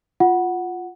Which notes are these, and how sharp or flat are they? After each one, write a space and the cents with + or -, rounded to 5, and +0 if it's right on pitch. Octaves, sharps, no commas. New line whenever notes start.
F4 +5 F#5 +0